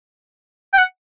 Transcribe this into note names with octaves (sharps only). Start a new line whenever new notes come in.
G5
F#5